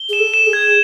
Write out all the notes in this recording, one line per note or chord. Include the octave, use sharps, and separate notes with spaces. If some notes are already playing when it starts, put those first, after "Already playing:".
Already playing: G7
G#4 E7
A4
E7
G#4
G#6